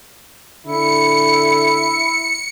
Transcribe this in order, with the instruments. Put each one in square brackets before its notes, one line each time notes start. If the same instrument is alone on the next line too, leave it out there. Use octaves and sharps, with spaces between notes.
[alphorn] D3 [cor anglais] E4 [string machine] C#7